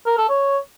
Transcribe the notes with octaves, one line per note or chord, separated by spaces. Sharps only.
A#4
A4
C#5